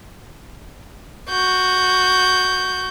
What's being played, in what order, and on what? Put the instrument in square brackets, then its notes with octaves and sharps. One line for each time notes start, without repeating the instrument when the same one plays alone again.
[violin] F#4 G6